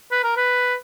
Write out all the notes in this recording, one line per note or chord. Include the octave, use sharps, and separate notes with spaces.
B4
A#4
B4